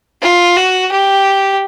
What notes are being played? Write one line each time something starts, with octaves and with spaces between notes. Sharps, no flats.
F4
F#4
G4